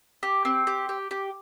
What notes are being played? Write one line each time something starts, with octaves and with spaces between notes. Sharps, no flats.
G4
C4
G4
G4
G4